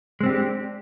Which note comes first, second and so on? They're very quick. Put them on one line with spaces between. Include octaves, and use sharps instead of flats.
G#3 C4 G4 D4